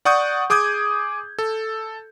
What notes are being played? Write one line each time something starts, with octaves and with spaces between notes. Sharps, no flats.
D5 F#5 C#6 D#6 G6
G#4 D6 D#6 G6 G#6
A4